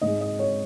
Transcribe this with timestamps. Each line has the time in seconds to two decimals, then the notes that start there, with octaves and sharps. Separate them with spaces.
0.01 G#2 G#3 D#5
0.21 D#5
0.39 C#5